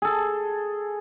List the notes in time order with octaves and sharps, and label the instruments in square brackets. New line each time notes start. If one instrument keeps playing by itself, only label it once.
[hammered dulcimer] G#4 A4